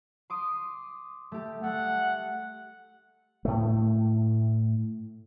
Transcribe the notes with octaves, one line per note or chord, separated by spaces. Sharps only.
C6 D6 D#6
A3 G4
A3 F#5
A2 A3